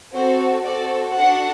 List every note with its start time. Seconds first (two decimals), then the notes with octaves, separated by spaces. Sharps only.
0.14 C4 F#4 A4 C5
0.64 C4 F#4 A4 D5
1.16 D4 F#4 A4 F#5